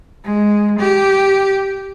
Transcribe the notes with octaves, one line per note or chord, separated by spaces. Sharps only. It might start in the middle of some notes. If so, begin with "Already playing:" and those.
G#3
G4